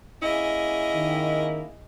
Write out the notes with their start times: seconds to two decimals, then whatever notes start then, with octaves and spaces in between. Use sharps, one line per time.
0.23 A#3 C#4 E4 G#4 D#5
0.94 D#3